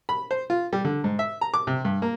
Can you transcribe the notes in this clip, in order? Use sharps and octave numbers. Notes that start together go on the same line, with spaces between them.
B5
C5
F4
G3
D3
G#2
E5
A#5
D6
C3
G2
A#3